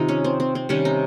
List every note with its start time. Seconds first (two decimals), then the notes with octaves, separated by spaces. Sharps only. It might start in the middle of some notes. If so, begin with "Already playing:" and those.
Already playing: C3 D#3 D#4 F4
0.09 C#4
0.24 C4
0.40 C4
0.55 C4
0.69 C3 D#3 G3 C#4
0.85 D#4